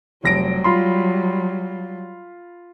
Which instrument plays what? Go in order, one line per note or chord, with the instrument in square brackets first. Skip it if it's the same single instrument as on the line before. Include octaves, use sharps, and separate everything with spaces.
[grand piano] F1 A#6 D7 [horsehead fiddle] F#3 G3
[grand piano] F4 B5 C6